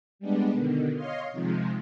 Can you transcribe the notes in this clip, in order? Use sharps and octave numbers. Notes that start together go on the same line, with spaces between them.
G3 G#3 B3 D4
B2 D3 D#3
C#5 D#5 F5 C6
C3 D#3 F3 G#3